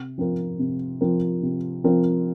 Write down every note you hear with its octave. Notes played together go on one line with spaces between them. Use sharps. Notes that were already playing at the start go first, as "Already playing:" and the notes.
Already playing: C3
F3 C4 F4 A#4
C3
F3 C4 F4 A#4
C3
F3 C4 F4 A#4